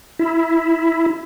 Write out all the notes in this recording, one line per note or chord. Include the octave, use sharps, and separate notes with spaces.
E4